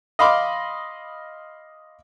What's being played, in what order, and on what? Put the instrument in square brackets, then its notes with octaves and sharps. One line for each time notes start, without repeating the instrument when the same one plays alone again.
[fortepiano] D#5 F5 B5 C6 D6